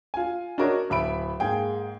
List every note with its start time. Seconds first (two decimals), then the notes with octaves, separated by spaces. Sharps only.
0.14 F4 G#5
0.58 D4 F#4 A#4 C#5 D#5
0.90 D1 E5 B5 D7
1.40 G#2 A#3 G#4 G5